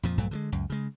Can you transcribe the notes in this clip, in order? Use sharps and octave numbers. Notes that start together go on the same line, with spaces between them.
F2 A#2 F3
A#1 G2 F#3 A3
D3 D#3 G#3
C#2 F#2
C#3 G#3